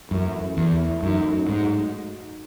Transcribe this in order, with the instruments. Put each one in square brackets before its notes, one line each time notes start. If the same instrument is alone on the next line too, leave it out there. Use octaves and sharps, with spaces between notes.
[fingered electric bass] F#2 [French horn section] E3 A3 E4
[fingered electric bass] E2
[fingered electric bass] F#2 [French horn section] F#3 A3 D#4 F#4
[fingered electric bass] G#2